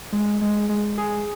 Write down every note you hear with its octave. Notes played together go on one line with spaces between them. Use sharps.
G#3
G#3
G#3
G#4